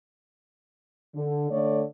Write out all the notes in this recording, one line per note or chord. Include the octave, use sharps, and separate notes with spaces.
D3
D3 A3 C#5 D5